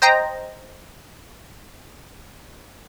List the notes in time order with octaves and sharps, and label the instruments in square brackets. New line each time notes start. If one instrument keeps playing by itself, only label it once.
[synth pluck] C5 D#5 G5 A#5